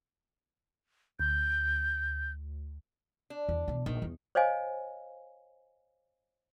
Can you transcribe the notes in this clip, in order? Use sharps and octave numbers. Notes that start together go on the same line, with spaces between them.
D2 G6
D4
E2
B2 E3
A#1 D#3
E2
C5 C#5 D#5 F5 G#5